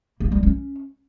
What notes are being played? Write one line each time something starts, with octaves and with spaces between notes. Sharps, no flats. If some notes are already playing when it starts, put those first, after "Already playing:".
A#3
G3
C#4